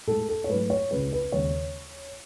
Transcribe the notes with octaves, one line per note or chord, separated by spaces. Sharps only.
A2 G#3 A4
A4
C#5
G#2 F#3 A3 B4
C#5
C#2 C#3 G#3 B4
B4
D#2 C#3 G#3 C#5